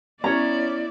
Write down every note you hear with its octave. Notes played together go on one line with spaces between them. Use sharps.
B3 C#4 E4 C#5 D5 A#5